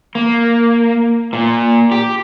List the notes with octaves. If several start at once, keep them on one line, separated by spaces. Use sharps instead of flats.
A#3
A#2
G4